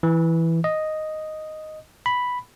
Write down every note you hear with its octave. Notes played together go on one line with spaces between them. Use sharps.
E3
D#5
B5